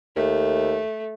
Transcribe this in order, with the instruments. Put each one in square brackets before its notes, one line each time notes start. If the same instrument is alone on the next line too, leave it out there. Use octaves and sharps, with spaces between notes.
[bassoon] D#2 [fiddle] A3